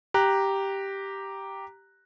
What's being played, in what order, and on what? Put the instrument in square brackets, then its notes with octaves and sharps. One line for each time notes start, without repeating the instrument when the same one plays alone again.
[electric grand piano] G4 A#5 F#6